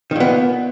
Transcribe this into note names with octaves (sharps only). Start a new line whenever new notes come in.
A#2 D#3 B3